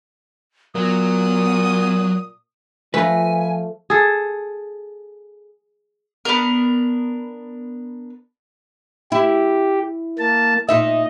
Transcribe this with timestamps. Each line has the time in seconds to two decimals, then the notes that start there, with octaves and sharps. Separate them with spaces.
0.75 A#2 F#3 B3 D#6
2.94 F3 A3 B4 G#5 A#5
3.90 G#4 A4
6.25 B3 D4 A#4
9.12 E4 G4
10.19 A#3 A5
10.69 A#2 D#4 D#5 E5